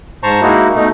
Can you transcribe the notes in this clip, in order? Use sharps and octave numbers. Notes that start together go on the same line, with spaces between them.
G#2 C5 A5 A#5 C#6
G#3 A#3 D#4 E4 F#4
B2 A3 D#4